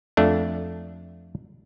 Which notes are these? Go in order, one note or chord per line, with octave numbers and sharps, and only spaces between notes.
F2 A3 D4